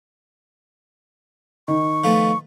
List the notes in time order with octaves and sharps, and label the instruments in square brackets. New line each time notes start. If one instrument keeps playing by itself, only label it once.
[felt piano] D#3 [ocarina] C#6
[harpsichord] F3 A3 B3